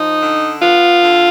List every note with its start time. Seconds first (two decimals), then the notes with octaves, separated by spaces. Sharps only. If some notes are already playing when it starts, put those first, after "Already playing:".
Already playing: F3 D#4
0.20 D3
0.61 B3 F4
1.02 D3